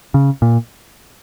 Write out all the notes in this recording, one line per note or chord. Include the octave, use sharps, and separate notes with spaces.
C#3
A#2